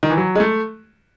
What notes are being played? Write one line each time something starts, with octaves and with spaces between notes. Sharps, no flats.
D#3
E3
F#3
G#3
A3